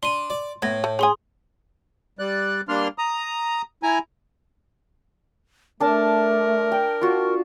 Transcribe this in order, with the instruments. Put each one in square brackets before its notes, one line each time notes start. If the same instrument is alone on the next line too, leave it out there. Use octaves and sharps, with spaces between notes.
[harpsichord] D4 [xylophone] C6 D#7
[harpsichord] D5
[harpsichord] A2 [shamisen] B3 [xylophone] G#6 A#6
[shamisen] A3
[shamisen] C#4 G#5 [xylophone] G#4 C6 D#6
[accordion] G3 D5 F#6
G3 A#3 D4 C6 F6
A#5 D#6
E4 G#5 A#5
[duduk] A3 [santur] D4 A5 [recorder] A#4
[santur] G5
F4 F#4